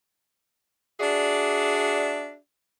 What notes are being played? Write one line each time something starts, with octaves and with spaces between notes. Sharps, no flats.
D4 F#4 G#4 D5 E5